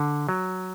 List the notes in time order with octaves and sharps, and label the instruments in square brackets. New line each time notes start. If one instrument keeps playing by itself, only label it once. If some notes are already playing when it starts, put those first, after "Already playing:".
Already playing: [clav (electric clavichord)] D3
F#3